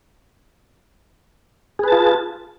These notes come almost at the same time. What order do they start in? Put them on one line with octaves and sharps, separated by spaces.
G#4 B4 A5 F4